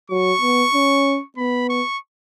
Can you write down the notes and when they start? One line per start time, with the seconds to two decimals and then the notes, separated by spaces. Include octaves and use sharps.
0.10 F#3 C#6
0.41 B3
0.74 C#4
1.37 B3 B5
1.69 C#6